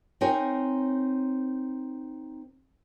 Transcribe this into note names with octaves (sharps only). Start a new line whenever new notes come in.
C4 D#4 A#4 C#5 G#5